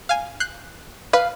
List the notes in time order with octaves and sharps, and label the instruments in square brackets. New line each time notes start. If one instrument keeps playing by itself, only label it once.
[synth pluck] F5 G#5
F#6 G6 C7
[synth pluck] B4 [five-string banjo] F5